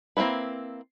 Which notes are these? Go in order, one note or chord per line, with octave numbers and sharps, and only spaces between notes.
A#3 C4 D4 E4 B4